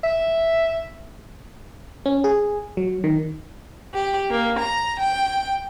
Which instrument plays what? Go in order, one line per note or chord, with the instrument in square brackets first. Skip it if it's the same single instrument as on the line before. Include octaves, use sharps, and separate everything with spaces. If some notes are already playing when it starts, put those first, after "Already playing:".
[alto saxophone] E5
[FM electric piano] C#4
G#4
F#3
D#3
[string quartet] G4
A#3
A#5
G5